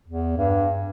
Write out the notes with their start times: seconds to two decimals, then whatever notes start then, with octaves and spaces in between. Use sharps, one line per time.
0.08 E2
0.38 G2